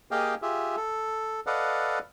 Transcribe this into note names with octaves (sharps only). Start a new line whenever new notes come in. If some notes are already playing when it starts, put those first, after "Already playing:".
A#3 G4 G#4 D#5 F5 G5
F4 G4 G#4 E5
A4
A4 B4 D5 D#5 F5 F#5